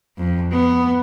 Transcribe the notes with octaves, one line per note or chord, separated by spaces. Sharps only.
F2
B3